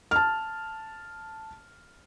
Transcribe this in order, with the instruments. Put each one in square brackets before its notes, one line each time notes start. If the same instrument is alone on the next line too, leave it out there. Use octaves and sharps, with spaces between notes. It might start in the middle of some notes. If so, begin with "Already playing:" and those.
[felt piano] A5 F6